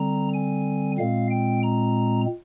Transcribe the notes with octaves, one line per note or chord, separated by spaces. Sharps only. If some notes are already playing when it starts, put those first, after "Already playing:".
Already playing: D3 G3 C4 A#5
G#5
A#2 G#3 C4 F5
G5
A#5